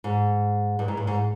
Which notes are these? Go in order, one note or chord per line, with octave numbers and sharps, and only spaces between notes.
G#2
G2
G#2
G2
G#2